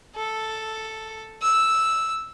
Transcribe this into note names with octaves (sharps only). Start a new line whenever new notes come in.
A4
E6